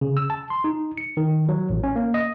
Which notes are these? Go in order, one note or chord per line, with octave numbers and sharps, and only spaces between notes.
C#3
E6
A5
C6
D#4
C#7
D#3
F#3
A1
C#4
A#3
D#5